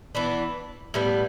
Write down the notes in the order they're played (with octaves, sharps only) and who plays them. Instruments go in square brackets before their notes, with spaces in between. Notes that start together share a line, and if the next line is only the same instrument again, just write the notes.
[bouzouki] E3 B3 D4
A2 G3 B3